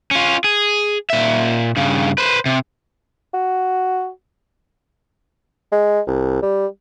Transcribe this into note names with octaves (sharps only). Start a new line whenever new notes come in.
C#4 F4
G#4
A#2 E5
G2 C#3
B4 C5
C3
F#4
G#3
C2
G3